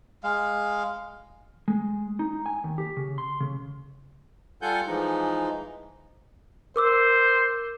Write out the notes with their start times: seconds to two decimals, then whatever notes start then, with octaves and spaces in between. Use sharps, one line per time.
0.24 G#3 F5
1.68 G#3
2.19 D#4
2.46 G#5
2.64 D#2
2.78 G4
2.97 C#3
3.18 C6
3.40 C#3
4.62 G3 F4 A4 F#5 G#5 G6
4.87 E3 F3 G#3 D#4
6.76 A#4 C5 D6 E6